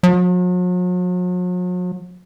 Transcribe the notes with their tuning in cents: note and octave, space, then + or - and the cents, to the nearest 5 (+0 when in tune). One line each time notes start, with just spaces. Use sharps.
F#3 -45